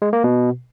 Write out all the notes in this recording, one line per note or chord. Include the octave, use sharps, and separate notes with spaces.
G#3
A#3
B2